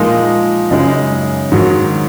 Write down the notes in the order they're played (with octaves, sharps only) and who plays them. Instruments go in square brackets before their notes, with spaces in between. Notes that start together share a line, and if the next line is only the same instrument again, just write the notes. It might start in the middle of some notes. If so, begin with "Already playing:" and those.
Already playing: [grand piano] A#2 F3 G#3 D#4 A#4
F#2 C#3 G#3 D#4
G#2 D#3 F#3